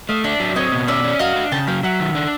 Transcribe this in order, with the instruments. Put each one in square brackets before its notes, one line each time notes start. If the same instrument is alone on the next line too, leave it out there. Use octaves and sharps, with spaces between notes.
[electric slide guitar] A3 [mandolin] D#5 F5
[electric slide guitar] D4 [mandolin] D5 E5
[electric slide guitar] F#3
[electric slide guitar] C4 [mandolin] C#5 D#5
[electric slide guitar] B2
[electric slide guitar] C#4 [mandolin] D5 E5
[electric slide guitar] C#4
[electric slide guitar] F#4 [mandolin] D#5 F5
[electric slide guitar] D4
[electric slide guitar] C#3 [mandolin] G5 A5
[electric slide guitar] F#3 [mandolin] F5 G5
[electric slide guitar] F#3 [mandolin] E5 F#5
[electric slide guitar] D#3
D4